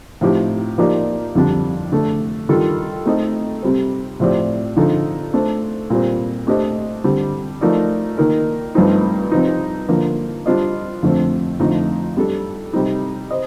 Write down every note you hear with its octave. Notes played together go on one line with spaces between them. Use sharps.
A2 F3 C4 D#4 G4
F3 A#3 D#4 G4 D5
F2 D3 G3 D4
D3 A3 D4 A4
D#3 G3 D4 F4 A4
A3 C4 D#4 A4 D#5
C3 G3 C4
A2 F3 C4 G4 D5
D3 F3 C4 D#4 A4
A3 D4 A4 C5
A#2 G3 C4
A3 D4 G4 C5 D#5
D3 G3 C4
F3 A3 D#4 A#4 D5
D#3 A#3 D#4 A#4
G2 F3 A3 C4 D#4
C3 F3 C4 D#4
D3 F3 A#3
G3 D4 F4 C5 D#5
F2 D3 A3 C4
F2 D3 F3 A3 D#4
G3 D4 A4
C3 G3 C4 D#4
C5 D#5